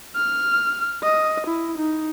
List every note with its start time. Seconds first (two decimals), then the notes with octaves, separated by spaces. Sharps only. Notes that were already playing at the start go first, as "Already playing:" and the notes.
0.16 F6
1.03 D#5
1.47 E4
1.77 D#4